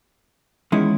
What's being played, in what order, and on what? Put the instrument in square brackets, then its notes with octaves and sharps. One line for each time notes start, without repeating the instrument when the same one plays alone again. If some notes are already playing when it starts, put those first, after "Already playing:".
[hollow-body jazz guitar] E2 D#3 G#3 C#4 E4